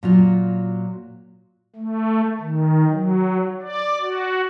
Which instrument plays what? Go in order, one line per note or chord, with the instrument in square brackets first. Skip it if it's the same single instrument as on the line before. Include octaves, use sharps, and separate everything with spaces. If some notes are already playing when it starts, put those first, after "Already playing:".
[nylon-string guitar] A#2 F#3 F4
[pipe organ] A3
D#3
F#3
D5
F#4